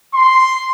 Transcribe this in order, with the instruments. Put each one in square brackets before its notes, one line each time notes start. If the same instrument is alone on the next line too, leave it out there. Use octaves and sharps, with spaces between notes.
[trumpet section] C6